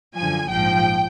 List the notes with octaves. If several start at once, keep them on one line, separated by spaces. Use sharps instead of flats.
F#2 D3 F3 G#5
A#1 G#2 F3 G5